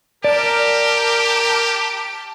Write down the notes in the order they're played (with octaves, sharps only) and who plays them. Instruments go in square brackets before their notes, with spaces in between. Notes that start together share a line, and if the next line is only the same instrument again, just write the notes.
[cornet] G4 [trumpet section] A#4 [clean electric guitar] D5 [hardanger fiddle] A5